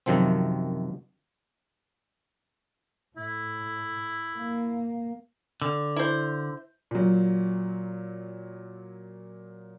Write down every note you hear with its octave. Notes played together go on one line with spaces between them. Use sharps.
F#2 C3 D#3 F3 C4
A2 E4
A#3
D3
E4 C5
A#2 F#3